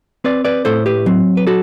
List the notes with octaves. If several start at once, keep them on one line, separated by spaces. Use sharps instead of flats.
C4 B4 D5
B4 D5
A2 A4 C5
G4 B4
F#3 C4
B4
F#4 A4